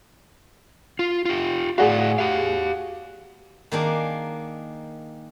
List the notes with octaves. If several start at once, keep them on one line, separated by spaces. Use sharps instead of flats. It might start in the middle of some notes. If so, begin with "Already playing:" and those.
F4
F4 G4
A2 F#4 G#4 D5 F5
G4 F5
D#3 A#3 D4 G#4